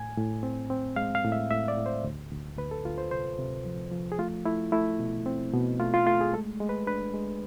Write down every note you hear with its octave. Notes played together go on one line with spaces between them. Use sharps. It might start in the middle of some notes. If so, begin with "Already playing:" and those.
Already playing: A2 G#5
A2
C4
C4
G#3 F5
F5
A2
E5
A2 E5
D5
A2
C5
D2
D2
D2 B4
A4
D2 F4
C5
C3 C5
C3
F3
F3
G#4
A3 F4
A3 E4
A3 E4
B2
C4
B2
A3 F4
F4
A3 F4
G#4
G#3 A4
G#3
B4
D4 B4
G#3